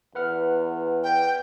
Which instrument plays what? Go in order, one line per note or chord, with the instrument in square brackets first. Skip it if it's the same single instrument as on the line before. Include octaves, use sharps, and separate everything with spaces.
[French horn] E2 [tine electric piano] B4 F#5 F6
[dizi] G5